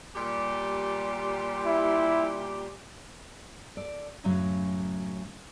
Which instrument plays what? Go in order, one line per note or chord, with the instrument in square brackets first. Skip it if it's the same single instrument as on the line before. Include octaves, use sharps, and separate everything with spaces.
[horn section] A#2 G3 G4
[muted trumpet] E4
[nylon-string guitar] A4 D5
F#2 A2 C#3 F#3 C#4